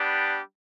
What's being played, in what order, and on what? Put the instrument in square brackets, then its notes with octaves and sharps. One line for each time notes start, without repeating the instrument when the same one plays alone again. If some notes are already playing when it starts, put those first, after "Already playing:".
Already playing: [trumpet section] G3 B3 D4 G4